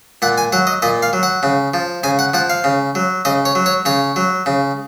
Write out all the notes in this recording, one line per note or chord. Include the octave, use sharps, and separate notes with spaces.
A#2 F#5
G#5
F#3 F#5
D#5
A#2 D#5
F5
F#3
F#5
C#3
F3
C#3 G#5
F#5
F3 F#5
F5
C#3
F#3
C#3 D#5
C#5
F#3
C#5
C#3 C#5
F#3
C#3